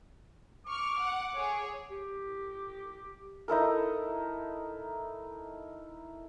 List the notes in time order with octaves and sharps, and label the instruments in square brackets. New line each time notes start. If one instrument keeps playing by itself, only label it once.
[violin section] C#6 F6 [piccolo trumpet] D6
[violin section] F#5
G#4 C#5
[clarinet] G4
[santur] D#4 E4 A4 A#4